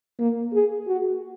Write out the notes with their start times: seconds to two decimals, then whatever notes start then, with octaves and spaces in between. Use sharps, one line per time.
0.19 A#3
0.53 G#4
0.88 F#4